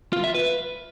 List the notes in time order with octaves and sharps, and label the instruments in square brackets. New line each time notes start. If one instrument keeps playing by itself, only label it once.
[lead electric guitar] F4
E5
B4